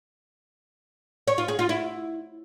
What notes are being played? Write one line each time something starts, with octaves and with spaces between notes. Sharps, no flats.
C#5
F4
G#4
F4
E4